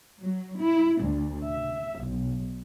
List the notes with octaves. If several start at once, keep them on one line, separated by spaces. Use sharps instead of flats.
F#3
E4
D2
E5
B1